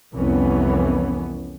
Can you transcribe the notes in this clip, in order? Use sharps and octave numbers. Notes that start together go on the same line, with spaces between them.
C2 F2 E3 B3 C#4